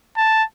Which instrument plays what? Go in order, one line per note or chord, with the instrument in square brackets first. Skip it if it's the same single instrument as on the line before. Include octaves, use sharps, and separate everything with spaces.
[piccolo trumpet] A5